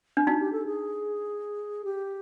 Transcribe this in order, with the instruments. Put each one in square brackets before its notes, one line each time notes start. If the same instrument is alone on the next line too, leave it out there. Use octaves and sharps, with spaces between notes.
[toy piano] D4
[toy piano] D#4 [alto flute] F#4
[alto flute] G4
A4
G#4
G4